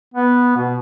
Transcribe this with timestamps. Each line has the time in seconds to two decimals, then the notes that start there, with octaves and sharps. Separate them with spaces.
0.14 B3
0.56 B2